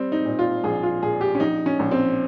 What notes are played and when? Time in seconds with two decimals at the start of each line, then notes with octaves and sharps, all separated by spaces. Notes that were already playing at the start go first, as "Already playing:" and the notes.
Already playing: G3 C4
0.12 D#4
0.26 A#2
0.39 F4
0.64 A#1 G#4
0.83 F4
1.02 A#2 G#4
1.21 G4
1.35 C#4
1.40 A#1 D#4
1.66 C#4
1.79 A#1
1.91 C4